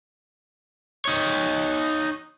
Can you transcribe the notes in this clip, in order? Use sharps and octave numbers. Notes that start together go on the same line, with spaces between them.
D#4 C#5